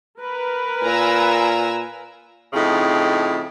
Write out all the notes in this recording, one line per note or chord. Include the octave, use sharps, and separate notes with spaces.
A#4 B4
A#2 G#5 A#5 E6
F2 A2 C#3 D#4